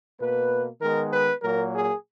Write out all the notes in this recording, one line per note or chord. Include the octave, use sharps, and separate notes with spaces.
B2 A#3 B4
D#3 G#3 B3 A#4
B4
A#2 F#3 A#3 A#4
G#4